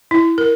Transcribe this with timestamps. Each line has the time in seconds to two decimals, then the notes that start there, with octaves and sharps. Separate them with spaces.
0.11 E4
0.38 A#4